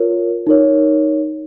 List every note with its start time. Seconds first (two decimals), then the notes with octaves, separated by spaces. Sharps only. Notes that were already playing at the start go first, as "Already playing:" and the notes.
Already playing: F4 A#4 C#5
0.47 D#4 A#4 C#5